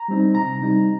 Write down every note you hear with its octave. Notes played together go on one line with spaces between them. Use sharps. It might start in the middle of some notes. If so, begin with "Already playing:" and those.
Already playing: A#5
G3 C4 D#4
C3 A#5
G3 C4 D#4